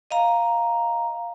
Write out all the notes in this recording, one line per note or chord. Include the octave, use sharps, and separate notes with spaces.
D#5 F5 A#5